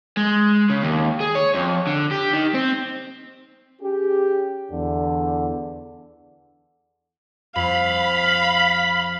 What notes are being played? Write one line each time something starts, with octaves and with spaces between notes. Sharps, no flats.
G#3
C#3
D#2
G#4
C#5
F2
D3
G4
D#3
C4
C#4 G4 G#4
E2 D3
F2 F5 B5